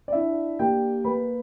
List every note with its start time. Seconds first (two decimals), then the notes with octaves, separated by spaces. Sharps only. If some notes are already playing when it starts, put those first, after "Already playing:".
0.08 D5
0.12 D4 E4 E5
0.59 A#3 G4 G5
1.04 A#3 B4 B5